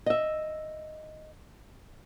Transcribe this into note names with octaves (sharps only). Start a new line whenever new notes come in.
D#5 E5